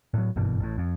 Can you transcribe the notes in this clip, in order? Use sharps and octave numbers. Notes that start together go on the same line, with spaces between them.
A2 F#3
F#1 G2 B2 E3
A1 A2
F2